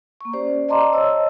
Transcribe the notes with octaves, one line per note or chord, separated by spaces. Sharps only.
A#3 C#6
C#4 G4 C5 D5
D5 D#5 A5 A#5 C6 D6
C5 C#5 D#5 A5 E6